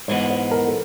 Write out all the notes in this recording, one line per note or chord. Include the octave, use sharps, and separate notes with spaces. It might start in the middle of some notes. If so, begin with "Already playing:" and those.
G#2 E3 G#3 B3 C5
C5
A#4
A4